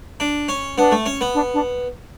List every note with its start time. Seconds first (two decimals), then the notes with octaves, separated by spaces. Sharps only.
0.20 D4
0.49 C#4
0.77 B3 D4
0.92 A3
1.06 C#4
1.21 B3
1.34 D4
1.54 D4